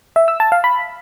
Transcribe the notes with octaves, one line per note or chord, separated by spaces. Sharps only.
E5
E6
A5
F5
B5